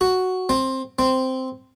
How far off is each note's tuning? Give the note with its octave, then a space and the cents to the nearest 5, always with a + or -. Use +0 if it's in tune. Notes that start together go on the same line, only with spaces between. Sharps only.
F#4 +0
C4 +15
C4 -5